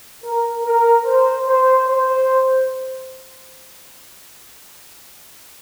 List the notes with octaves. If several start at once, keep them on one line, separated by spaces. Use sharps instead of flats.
A#4
A#4
C5
C5
C5